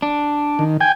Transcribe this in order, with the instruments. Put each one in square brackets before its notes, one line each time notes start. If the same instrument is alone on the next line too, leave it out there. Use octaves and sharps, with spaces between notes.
[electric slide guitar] D4
[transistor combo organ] D#3
G5 G#5